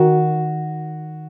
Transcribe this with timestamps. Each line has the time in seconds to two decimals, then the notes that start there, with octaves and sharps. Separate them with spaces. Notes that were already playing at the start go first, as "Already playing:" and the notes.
Already playing: D#3 F#4